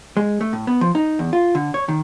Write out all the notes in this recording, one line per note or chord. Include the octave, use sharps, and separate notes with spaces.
G#3
A3
A2
B3
F3
D#4
E2
F4
D3
C#5
D#3